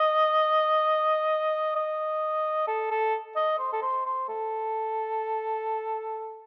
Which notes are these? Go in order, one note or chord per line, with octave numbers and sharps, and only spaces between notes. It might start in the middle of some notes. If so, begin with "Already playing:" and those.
Already playing: D#5
D#5
A4
A4
D#5
C5
A4
C5
C5
A4